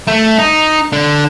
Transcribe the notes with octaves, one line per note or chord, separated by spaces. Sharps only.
A3
D#4
D3